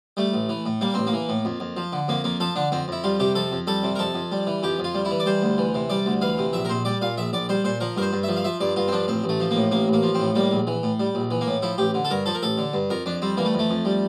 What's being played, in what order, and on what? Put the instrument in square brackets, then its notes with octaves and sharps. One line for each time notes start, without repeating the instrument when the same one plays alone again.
[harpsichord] G3 A3
A1
E3
A2
G3 A#3
A1 C4
A#3
E3
A2
F2
F2
F3
D3
F2 A#3
F2 A#3
F3 A4
D3 D4
F2 C4
F2 E4
G3 F4
C3 G4
F2 A4
F2
G3 A4
C3
A#4
F2 A4
F2
G3
E3
F2 G4
F2
F4
G3
E4
E3
D5
G3 C5
D2
E3
C3
G3 D5
D2
E3 F5
C3
A#1 E5
A#4
A#1 C5
G3 D5
A#2 F5
A#1 E5
A#1 D5
G3 C5
A#2 C5
F3 A#4
G2 A#4
C5
G2
F3 E5
F5
F3 E5
G2 D5
G2 F4
C4
F3 D4
A1 C4
A1
A3
F3
A2 A#3
A1 A#3
A1
A#3
F3
A2 C4
G3 A#3
A#1
E3
A2
G3
A#1
E3
A#3
A2
F3 E4
A1 G4
D3
A4
G2 A#4
F3 A4
A#4
A1 A4
D3
G2
F2 A#4
F2 D4
G3 C4
E3 A#3
A3
F2
A3
F2
G3